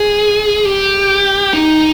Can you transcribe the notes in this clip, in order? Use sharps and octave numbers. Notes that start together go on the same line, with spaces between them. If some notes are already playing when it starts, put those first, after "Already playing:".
Already playing: G#4
G4
D#4